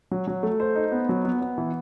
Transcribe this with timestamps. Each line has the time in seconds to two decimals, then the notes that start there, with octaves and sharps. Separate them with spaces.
0.11 F#3
0.27 F#3
0.43 A3
0.60 C5
0.75 D#4
0.92 B3
1.09 F#3
1.25 B3
1.42 B3
1.58 E3